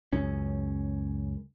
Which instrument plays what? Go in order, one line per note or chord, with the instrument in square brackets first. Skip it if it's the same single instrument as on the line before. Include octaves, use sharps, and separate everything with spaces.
[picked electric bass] C#2 F#2 C#4